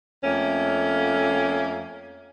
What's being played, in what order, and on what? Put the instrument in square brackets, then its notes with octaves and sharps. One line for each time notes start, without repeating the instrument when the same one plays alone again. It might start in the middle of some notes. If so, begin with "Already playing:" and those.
[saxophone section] F2 A3 A#3 C#4